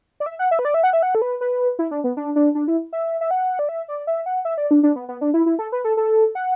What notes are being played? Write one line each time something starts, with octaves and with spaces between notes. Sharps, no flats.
D5
E5
F#5
E5
B4
D5
E5
F#5
E5
F#5
A4
B4
B4
E4
D4
B3
D4
D4
D4
E4
E5
E5
F#5
D5
E5
D5
E5
F#5
E5
D5
D4
D4
B3
B3
D4
E4
E4
A4
B4
A4
A4
F#5